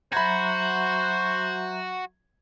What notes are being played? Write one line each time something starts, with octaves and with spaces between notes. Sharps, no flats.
F#3 F#4 C5 E5 A#5 B5 G#6